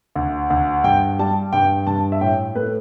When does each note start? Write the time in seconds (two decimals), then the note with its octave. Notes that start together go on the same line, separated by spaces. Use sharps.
0.16 D2
0.50 D2
0.84 G2 G5
1.19 G3 A5
1.53 G2 G5
1.87 G2 A5
2.12 E5
2.21 A2 G5
2.55 A3 B4